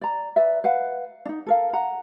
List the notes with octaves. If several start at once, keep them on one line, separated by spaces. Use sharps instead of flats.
D5 A#5
B4 D5 E5
B4 F5 F#5
D4 D#4
A4 A#4 F5
F#5 A#5